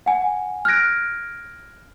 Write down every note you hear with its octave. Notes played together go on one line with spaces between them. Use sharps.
F#5 G#5
F6 F#6 G#6 A#6 D7